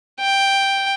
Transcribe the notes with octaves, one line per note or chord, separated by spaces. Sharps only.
G5